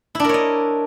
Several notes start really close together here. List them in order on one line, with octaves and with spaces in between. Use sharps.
E4 D4 A#4 C#5 D#5